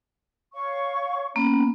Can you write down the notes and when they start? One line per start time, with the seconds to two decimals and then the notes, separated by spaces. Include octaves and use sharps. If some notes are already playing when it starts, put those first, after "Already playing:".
0.54 C#5 F5 C#6
1.36 A#3 B3 C#4